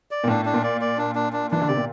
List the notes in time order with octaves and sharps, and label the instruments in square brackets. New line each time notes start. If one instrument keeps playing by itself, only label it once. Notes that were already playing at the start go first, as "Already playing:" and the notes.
[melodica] D5
[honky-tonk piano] A#2
[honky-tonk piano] A2 [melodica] D4
[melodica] D4
[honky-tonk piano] A#2
[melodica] D5
D5
D4
D4
D4
[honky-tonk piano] E3 [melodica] D4
[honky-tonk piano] D3
[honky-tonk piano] C3 [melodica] D5
[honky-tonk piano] A#2